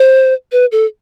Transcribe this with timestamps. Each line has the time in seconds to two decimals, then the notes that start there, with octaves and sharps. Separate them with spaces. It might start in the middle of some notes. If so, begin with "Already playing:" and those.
Already playing: C5
0.52 B4
0.72 A4